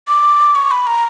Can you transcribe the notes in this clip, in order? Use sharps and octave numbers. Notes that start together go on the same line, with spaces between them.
D6
C#6
B5
A#5